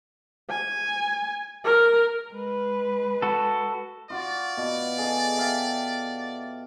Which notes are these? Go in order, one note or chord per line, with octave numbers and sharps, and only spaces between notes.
G#5
A#4
G#3 B4
F#4 A4
F4 F#4 D5
B2
G#4 A4 D#5
E5 F5 G5